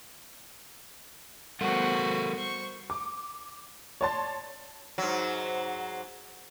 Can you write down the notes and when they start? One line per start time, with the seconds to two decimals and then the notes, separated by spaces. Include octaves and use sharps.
1.61 G3 B3 F#4 A4 A#4 C5 F#5
2.35 C5 C#6
2.90 D6
4.01 C#5 D5 A5 C6 A6
4.98 G#2 F#3